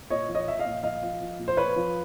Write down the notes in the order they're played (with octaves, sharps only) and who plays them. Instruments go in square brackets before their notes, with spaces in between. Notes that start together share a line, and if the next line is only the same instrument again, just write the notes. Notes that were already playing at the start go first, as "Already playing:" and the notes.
[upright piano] A#2 C#5 D#5
F3
C#5 D#5
F3 E5
D#5 F5
A#2
F3 D#5 F5
F3
F3
A#2
C5
F3 B4 C#5
F3